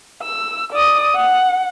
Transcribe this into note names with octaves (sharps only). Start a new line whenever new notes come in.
E6
D5 D#6
F#5